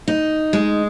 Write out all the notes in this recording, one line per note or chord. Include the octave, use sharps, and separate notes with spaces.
D#4
G#3